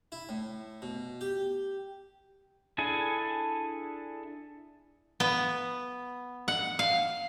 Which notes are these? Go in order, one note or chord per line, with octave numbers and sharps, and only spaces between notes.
E4
A2
B2
G4
D4 E4 G#4 A4 G#5
B3
F#5
F5